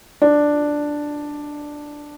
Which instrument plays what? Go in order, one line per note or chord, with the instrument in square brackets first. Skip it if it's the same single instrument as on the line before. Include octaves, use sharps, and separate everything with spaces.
[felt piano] D4